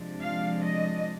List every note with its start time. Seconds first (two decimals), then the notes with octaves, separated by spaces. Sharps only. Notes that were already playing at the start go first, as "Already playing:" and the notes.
Already playing: C3 F3 G#3 D4
0.22 F5
0.63 D#5